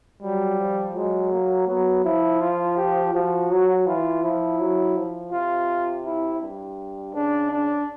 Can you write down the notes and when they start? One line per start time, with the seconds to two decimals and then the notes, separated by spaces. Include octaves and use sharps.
0.22 F#3 G3
0.58 F3
0.95 F#3 G#3
1.32 A#3
1.68 F#3 B3
2.04 F3 E4
2.41 F4
2.77 G4
3.13 F3 F#4
3.51 F#3
3.86 E3 F4
4.23 F3 E4
4.60 F#3
4.96 F3
5.32 C3 F4
6.05 E4
6.42 G2
7.14 C#3 D4
7.51 D4